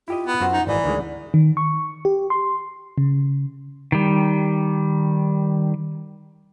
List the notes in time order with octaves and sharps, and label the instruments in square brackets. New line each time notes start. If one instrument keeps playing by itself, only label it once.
[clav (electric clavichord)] E4 G4 D#5 [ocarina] F4
[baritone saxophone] B3
[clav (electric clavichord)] F#2 F#4 C5 [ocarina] F#5
[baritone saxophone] D#4
[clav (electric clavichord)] G#1 D#5 [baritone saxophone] E3 [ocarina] D5
[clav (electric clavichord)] D2 D#3 G#3
[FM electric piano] D#3
C#6
G4
C6
C#3
[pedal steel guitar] D#3 G3